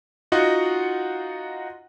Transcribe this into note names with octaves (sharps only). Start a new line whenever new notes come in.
D#4 F4 F#4 D#5 F#5